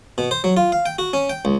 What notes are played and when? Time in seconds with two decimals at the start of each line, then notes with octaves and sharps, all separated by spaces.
0.18 B2
0.31 C5
0.44 F#3
0.57 F4
0.72 F5
0.86 G5
0.99 F#4
1.13 C#4
1.29 G5
1.45 C#2